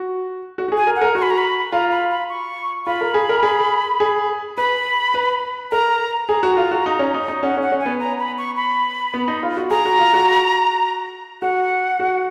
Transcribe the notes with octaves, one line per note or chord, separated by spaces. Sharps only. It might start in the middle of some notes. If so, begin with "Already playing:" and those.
Already playing: F#4
F#4
F#4
G#4
G#5
A#4
F#5
A#4
F#4 C#6
B5
A#5
B5
F4 A#5
B5
B5
C#6
F4 B5
A#4
G#4
A#4
G#4
G#4
B4 B5
B4
A#4 A#5
G#4 A#5
F#4
F4
F#4
D#4
C#4
D#4
D#4
C#4 F#5
C#4 F#5
C#4
G#5
B3
A#5
B5
C#6
B5
B3
D#4
F4
F#4
G#4 A#5
F#4
F4
F#4
F#4 F#5
F#4